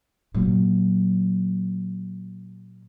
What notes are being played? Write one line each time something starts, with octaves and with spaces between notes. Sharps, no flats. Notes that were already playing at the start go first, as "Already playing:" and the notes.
A#2 F#3